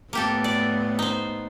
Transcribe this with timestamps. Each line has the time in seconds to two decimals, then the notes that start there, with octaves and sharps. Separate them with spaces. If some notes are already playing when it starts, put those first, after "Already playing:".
0.13 A2 A#3 B3 G4 A4
0.44 D5
0.99 D#4 C5